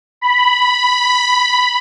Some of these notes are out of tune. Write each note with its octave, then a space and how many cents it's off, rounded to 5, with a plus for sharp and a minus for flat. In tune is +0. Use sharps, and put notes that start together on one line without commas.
B5 -5